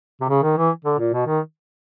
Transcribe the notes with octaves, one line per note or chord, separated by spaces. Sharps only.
C3
C#3
D#3
E3
D3
A#2
B2
D#3